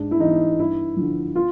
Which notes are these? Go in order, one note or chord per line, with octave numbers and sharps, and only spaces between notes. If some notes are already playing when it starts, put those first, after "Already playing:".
Already playing: G#2 D4
E4
E3 D#4
G2 E4
D3 F3
F4